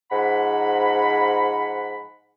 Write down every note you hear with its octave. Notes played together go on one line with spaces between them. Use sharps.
G#2 F3 F#5 B5